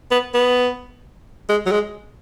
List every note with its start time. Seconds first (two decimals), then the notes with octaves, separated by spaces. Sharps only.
0.11 B3
0.34 B3
1.49 G#3
1.66 F#3
1.72 G#3